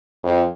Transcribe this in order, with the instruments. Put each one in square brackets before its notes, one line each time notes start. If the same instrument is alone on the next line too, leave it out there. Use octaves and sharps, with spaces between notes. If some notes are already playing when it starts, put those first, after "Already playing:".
[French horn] F2